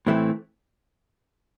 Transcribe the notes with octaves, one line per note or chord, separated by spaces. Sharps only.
A2 E3 A3 C4